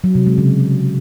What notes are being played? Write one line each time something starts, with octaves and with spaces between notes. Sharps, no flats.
F#3
C3
G#3
C#3